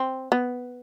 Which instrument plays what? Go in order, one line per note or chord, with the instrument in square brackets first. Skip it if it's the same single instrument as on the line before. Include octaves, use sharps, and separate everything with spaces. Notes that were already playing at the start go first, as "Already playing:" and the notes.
Already playing: [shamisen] C4
B3